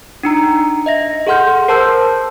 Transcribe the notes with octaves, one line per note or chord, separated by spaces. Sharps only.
D4 D#4 A#5
D#5 E5 A#6
G#4 A4 F#5 C6 F6 G6
A#4 C5 A5 C6 E6 G6